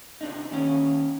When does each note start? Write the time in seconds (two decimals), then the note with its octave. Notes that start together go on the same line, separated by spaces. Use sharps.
0.21 C3 D4 D#4
0.51 D#2 D#3 C#4